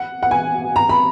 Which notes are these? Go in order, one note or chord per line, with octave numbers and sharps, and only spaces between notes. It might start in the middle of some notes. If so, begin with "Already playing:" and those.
Already playing: F#5
F#5
G#5
A#5
B5